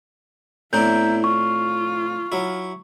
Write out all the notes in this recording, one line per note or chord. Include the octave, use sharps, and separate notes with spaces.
A2 B3 C4 D4 E4 A#5 G6
F4 C#6
F#3 E4